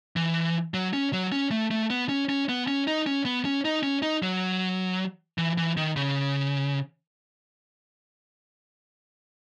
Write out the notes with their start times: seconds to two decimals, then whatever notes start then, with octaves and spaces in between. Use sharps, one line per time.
0.16 E3
0.74 F#3
0.93 C#4
1.13 F#3
1.32 C#4
1.51 A3
1.71 A3
1.90 B3
2.09 C#4
2.29 C#4
2.49 B3
2.68 C#4
2.87 D#4
3.07 C#4
3.25 B3
3.45 C#4
3.65 D#4
3.83 C#4
4.02 D#4
4.22 F#3
5.38 E3
5.58 E3
5.77 D#3
5.96 C#3